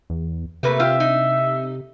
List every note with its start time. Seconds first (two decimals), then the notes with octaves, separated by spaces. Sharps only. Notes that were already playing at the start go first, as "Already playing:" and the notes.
0.10 E2
0.63 C3 A3 A#3 B4
0.80 F4 G4 E5
1.00 D#4